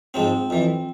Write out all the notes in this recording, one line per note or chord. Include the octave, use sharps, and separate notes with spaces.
G#2 F3 C4
F2 E3